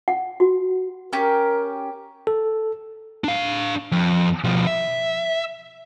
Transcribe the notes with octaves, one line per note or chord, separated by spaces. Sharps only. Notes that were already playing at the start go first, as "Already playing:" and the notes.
F#5
F#4
C#4 G4 A#4
A4
D4 F5
F2
B2 F3
E5